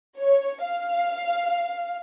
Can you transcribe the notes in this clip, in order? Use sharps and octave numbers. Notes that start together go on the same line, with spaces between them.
C#5
F5